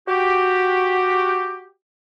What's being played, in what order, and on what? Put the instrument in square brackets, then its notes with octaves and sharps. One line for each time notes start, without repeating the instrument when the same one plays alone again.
[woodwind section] F#4 G4